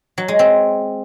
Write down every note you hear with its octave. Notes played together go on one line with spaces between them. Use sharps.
F#3
G#3
C4